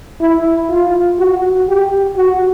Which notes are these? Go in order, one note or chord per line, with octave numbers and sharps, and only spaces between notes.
E4
F4
F#4
G4
F#4